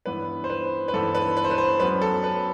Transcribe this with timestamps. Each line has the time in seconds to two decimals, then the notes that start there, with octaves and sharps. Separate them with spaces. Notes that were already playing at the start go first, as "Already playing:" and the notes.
0.06 G2 E3 B3 B4
0.44 C5
0.50 B4
0.88 B4
0.93 G2 E3 B3 A4
1.15 B4
1.37 B4
1.45 C5
1.51 B4
1.58 C5
1.80 F#2 F#3 B3 B4
2.02 A4
2.24 B4